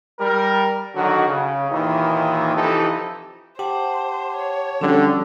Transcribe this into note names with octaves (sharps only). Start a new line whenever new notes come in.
G3 A#4
D3 D#3 F#3 F#4
C#3
D#2 A#2 D#3 E3
C3 E3 F3 D#4 G4 A4
G4 C5 F#5 A5 D6
C#5
D3 F3 G3 C#4 F#4 G4